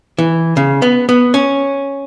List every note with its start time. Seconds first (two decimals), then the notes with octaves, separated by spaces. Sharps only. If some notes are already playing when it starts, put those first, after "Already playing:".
0.18 E3
0.57 C#3
0.82 B3
1.09 B3
1.34 C#4